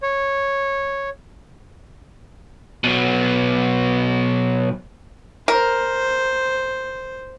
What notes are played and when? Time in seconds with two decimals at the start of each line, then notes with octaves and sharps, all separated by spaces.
0.03 C#5
2.84 B2 F#3
5.48 A#4 C5